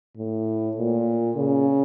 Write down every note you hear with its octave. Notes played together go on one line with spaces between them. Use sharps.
A2
A#2
C#3